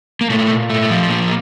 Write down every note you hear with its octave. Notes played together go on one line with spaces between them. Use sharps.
A#3
A#2 A3
A#2
A3
F3
A#2 A#3